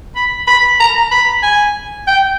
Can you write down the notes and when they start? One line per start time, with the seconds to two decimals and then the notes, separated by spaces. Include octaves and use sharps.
0.16 B5
0.47 B5
0.80 A#5
1.12 B5
1.43 G#5
2.07 G5